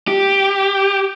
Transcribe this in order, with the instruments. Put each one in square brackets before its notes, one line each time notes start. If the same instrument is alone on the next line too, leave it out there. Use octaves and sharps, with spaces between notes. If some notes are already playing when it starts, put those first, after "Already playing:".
[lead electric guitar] G4